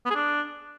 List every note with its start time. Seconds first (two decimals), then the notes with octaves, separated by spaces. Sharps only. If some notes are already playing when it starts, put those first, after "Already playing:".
0.05 B3
0.10 G#4
0.15 D4